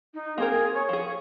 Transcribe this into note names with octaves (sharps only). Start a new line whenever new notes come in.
D#4
A#3 C4 G#4 A#4
C#5
F3 G#4